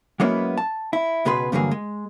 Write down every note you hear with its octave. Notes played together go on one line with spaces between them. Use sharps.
F#3 G#3 A#3 B3 C#4 E4
A5
E4
C#2 B2 B3 G#4 B4 C6
G2 D3 E3 F#3 A#3 G#4
G#3